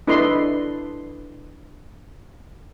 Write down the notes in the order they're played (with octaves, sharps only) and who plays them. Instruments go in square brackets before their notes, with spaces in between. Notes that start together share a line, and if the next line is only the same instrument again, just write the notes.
[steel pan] D4 E4 A4 B4 D#5 C6